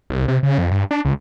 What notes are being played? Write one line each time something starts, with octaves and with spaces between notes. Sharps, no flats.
C2
C3
C#3
F2
G2
D4
C#2